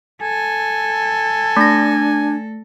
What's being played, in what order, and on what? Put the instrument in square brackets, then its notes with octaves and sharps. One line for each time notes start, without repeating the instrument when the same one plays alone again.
[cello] A4 [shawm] G#5
[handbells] A3 A#6 [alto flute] D4